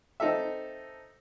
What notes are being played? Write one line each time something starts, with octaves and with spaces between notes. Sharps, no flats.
C4 D#4 A4 E5